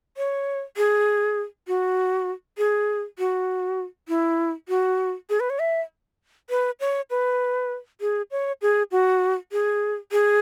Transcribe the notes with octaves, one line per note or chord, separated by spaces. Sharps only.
C#5
G#4
F#4
G#4
F#4
E4
F#4
G#4
B4
C#5
E5
B4
C#5
B4
G#4
C#5
G#4
F#4
G#4
G#4